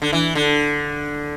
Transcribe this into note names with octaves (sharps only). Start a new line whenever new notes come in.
D3
E3
D3